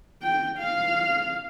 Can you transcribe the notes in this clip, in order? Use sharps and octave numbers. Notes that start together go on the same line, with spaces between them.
G5
F5